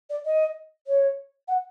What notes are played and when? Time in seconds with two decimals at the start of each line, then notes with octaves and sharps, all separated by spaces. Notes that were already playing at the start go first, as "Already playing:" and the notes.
0.09 D5
0.25 D#5
0.87 C#5
1.47 F#5